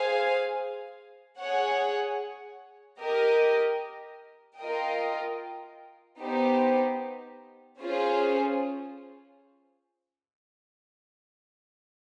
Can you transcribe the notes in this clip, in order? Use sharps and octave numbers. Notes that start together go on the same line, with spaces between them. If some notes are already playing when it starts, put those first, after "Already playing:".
Already playing: G#4 C5 F5 G#5
G#4 C#5 F#5
G4 A#4 D#5
F4 A#4 D#5 G5
B3 D#4 G4 C5
C#4 F4 G#4 C5